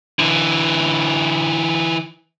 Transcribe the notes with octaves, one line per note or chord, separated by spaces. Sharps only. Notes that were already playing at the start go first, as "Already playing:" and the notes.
D3 E3